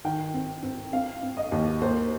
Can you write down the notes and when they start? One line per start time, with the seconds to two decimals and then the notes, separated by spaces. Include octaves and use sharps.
0.05 D#3 G5
0.34 C4
0.63 C4
0.93 C4 F5
1.23 C4
1.37 D#5
1.52 D#2
1.82 A#3 C5